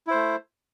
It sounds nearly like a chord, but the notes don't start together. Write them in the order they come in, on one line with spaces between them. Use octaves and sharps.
E4 C5 A3